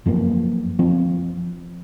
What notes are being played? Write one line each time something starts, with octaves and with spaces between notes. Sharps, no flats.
F#2 F3 A#3
F3 C4